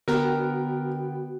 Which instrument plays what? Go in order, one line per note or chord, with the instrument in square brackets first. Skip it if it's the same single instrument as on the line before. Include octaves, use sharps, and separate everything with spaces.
[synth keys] D3 B3 G5 [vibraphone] F#4 [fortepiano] A#4